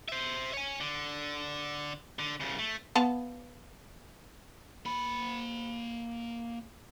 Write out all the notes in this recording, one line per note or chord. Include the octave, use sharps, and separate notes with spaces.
C5 E5
C#5 G#5
D3
D3
C2 C#3
A3
B3 F5 A5
A#3 B5